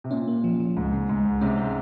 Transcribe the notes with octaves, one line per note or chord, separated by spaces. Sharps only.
C3
A#2 C#4
A#3
F3
F3
C#2 G#2
C#3
C#2 G#2
C#2
G#2 C3 C#4
G#3